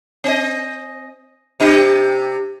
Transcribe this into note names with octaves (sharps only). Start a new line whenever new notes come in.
C4 D#5
C3 D4 G4